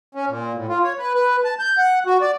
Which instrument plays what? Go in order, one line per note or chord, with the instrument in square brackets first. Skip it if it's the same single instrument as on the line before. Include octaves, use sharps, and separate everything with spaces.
[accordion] C#4
A#2
A2
F4
C#5
B4
B4
A5
G6
F#5
F#4
D5